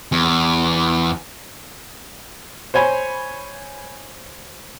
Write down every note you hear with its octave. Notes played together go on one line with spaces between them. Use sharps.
E2
C5 C#5 G#5 B5